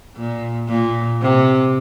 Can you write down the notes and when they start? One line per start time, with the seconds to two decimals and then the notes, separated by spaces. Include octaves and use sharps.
0.17 A#2
0.68 A#2
1.21 C3